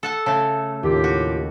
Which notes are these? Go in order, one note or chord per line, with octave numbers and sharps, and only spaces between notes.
A4 F#5 A5
C#3 A3 A5
D#2 A2 F4 G4
F#4